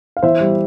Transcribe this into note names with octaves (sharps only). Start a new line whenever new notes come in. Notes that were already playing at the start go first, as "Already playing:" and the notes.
F5
E3 C5 E5
G3